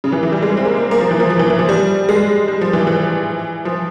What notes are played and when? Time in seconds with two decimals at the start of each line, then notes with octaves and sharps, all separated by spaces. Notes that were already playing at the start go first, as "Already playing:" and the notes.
0.04 C#3
0.12 E3
0.23 E3
0.32 G3
0.43 G#3
0.57 C4
0.65 A#3
0.77 A#3
0.91 A#3
1.00 F3
1.11 E3
1.20 F3
1.30 F3
1.39 E3
1.50 E3
1.59 F3
1.69 G3
2.09 G#3
2.48 G3
2.61 F3
2.73 E3
2.87 E3
3.65 F3